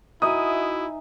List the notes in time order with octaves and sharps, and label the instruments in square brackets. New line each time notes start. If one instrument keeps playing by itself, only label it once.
[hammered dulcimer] D#4 E5 G#5 [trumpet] E4 [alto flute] F#4 [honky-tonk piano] D#6